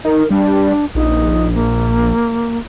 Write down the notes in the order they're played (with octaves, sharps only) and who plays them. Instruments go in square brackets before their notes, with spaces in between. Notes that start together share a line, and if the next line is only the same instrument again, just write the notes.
[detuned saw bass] D#4 [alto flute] A#4
[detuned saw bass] G3 [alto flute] D4
[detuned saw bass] A#1 [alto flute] D#4
[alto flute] A#3